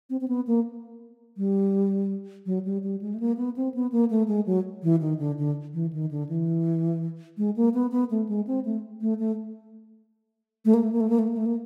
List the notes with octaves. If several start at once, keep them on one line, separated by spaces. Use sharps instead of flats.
C4
C4
B3
A#3
G3
F#3
G3
G3
G#3
A3
A#3
B3
C4
B3
A#3
A3
G#3
F#3
E3
D#3
D3
D3
E3
D#3
D3
E3
G#3
A#3
B3
B3
A3
G#3
C4
A3
A3
A3
A3
A#3
A3
A#3
A3
A#3
A3
A#3
A3
A#3